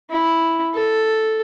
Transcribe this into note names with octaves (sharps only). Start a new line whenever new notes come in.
E4
A4